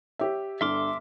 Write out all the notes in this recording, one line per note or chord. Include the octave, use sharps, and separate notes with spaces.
G4 C#5 E5
G1 D3 E5 C6 D6 F6